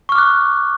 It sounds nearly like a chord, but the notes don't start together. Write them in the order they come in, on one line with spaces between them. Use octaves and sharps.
C#6 F6 D6 F#6